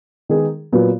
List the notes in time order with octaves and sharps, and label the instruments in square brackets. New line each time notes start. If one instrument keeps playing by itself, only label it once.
[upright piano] D#3 G#3 B3 D#4 G#4
A#2 F#3 B3